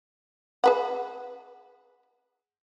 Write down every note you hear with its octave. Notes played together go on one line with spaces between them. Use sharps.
G#4 B4 F#5